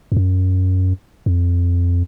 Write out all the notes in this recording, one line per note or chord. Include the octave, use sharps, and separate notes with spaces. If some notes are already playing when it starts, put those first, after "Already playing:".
F2
F#2
F2